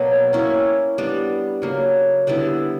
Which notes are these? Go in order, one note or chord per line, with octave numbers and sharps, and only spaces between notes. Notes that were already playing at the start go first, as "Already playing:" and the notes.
Already playing: B2 F#3 A#3
A#3 C#4 E4
G3 B3 D4
C#3 F#3 A#3
D3 G3 B3 E4